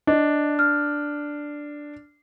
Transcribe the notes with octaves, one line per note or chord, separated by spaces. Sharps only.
D4 D#5
F6